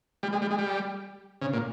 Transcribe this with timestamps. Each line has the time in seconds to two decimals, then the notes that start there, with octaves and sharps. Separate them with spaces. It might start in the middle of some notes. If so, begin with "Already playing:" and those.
0.23 G3
0.33 G#3
0.42 G3
0.51 G#3
0.58 G3
1.41 C#3
1.53 A#2